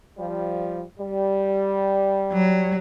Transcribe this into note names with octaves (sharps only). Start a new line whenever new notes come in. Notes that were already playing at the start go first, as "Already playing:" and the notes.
F3 G3
G3
F#3